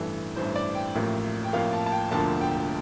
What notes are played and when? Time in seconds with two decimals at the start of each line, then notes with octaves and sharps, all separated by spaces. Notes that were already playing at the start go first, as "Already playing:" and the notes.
Already playing: A1 G2 E3 A4
0.36 A1 G2 E3 C5
0.56 D5
0.75 G5
0.95 A1 A2 F3 A#3
1.44 G5
1.53 A1 A2 F3 A#3 F5
1.73 A5
1.86 A5
1.92 G5
2.11 E1 D2 D3 F3 A#3 A5
2.41 G5